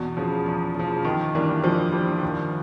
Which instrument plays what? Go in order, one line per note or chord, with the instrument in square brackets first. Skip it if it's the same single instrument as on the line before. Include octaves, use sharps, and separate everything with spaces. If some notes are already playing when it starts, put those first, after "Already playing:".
Already playing: [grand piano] E2 [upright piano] B2
[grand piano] C#3 F3
E2
C#3 F3
[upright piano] D#3 [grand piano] E3
[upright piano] E3 [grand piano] G3 A#3 D4
[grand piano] E3 [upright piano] F3
[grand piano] G3 A#3 D4
D#2